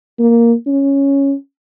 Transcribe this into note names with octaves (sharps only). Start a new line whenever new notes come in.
A#3
C#4